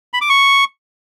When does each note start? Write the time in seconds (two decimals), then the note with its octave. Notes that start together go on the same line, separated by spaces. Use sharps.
0.14 B5
0.21 D6
0.29 C#6